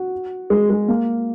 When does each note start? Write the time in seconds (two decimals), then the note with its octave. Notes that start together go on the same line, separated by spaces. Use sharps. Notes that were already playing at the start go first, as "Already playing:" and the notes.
Already playing: F#4
0.50 G#3
0.70 G#3
0.88 A#3